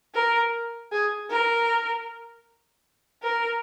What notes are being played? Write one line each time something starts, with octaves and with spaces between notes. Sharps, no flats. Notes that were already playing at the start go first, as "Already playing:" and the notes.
A#4
G#4
A#4
A#4